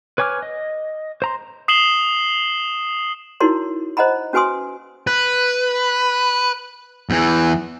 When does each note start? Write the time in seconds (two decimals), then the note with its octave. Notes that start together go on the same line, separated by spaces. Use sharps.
0.18 B4 C#5 G#5 D6 F6
0.43 D#5
1.22 C5 A#5 C6
1.68 D#6 C7 E7 F#7 G7
3.40 D#4 E4 F#4 A#4 C#5 C6
3.97 C5 D#5 F#5 A#5 B5
4.33 C#4 F#4 B4 G#5 C6 D#6
5.07 B4
7.10 E2 E3